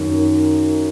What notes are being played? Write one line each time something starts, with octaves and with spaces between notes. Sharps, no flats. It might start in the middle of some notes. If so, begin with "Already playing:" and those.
Already playing: F#2 D#3